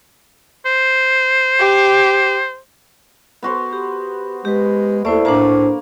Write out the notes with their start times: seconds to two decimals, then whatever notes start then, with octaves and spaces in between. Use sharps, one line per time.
0.66 C5
1.60 G4
3.43 B3 F#4 C5
3.73 G4
4.45 G#3 G4 B4
5.05 D#2 A3 E4 C5 D5
5.25 A2 A#3 D4 C5 A5